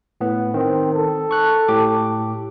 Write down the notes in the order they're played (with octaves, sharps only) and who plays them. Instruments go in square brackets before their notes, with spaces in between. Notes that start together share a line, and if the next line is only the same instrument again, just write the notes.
[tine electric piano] A2 B3
[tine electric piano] D#3 [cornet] C4
[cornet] A4
[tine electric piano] C#6 F#6
A2 G4 D6